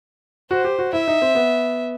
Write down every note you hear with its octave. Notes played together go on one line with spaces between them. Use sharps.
F#4 C5
G4
F#4
E4 E5
D#4
C4
B3